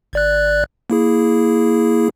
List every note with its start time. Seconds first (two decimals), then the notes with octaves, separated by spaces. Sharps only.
0.13 G#1 D5 F#6
0.90 A#3 E4 G#4